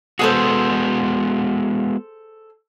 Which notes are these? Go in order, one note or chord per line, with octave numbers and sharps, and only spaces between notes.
G#3 B3 F#4 G#4 A4 C5